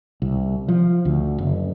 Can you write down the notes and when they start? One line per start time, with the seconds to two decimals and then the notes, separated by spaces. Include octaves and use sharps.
0.22 C2
0.68 F3
1.05 D2
1.38 F#1